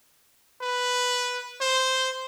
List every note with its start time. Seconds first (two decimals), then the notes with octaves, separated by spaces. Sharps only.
0.62 B4
1.61 C5